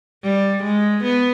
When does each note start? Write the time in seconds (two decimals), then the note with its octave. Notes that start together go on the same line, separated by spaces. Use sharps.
0.24 G3
0.63 G#3
1.04 B3